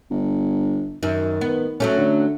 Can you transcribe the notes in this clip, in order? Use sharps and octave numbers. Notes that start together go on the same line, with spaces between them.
G1
F#2 D#3
B3
F#3 A3 C#4
D3